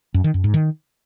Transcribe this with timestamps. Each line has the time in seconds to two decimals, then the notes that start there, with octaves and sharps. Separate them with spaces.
0.14 F#2
0.24 D#3
0.34 F#2
0.44 G#2
0.54 D#3